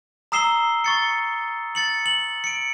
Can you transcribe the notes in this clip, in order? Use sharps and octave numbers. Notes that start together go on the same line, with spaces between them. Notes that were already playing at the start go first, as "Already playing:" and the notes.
A#5 D#6 E6 C7 E7 G7
C#6 A6 C#7
A6 C#7 F#7
F#7
C#7 D7